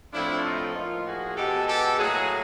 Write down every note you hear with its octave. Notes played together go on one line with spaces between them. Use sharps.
A2 F3 A3 C4 D4 E4
D#4 F4
A2 F3 A#3 D#4 F4
F#4 G#4
B2 G#3 B3 G4 A4
G4 A4
A2 F#3 A#3 F#4 G#4